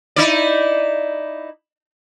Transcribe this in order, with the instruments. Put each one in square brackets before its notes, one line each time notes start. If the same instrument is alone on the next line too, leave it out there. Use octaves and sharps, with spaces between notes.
[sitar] D#4 E4 D5